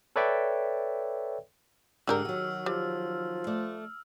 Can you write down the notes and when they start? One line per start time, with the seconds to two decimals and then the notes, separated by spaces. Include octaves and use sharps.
0.16 A4 B4 C#5 D5 E5 G5
2.07 G#2 D3 G#3 D4 G4 A#4 E6 F6
2.25 D#3 F#3 F#4
2.66 F3 G3
3.47 A3 D5